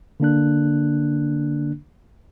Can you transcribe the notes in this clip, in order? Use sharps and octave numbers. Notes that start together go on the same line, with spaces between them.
D3 A#3 D4 F#6